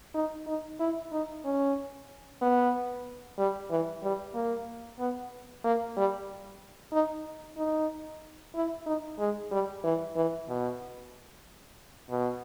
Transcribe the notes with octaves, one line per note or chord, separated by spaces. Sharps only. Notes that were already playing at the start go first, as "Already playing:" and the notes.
D#4
D#4
E4
D#4
C#4
B3
G3
E3
G3
A#3
B3
A#3
G3
D#4
D#4
E4
D#4
G#3
G3
E3
E3
B2
B2